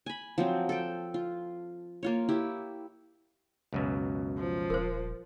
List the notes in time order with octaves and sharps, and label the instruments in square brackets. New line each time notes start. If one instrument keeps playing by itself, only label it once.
[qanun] G#5 B5
F3 F#3 C4 F4
A4 G5
F4
A#3 F4 C#5
E4 G4
[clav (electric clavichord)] C#2 F#2 B2
[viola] F3
[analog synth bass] D#1 [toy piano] A#4 C5